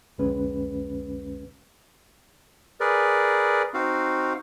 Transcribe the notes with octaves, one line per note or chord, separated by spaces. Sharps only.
C2 F2 D3 G#3 C#4 B4
G#4 A#4 B4 D5
C4 D#4 F#4 F5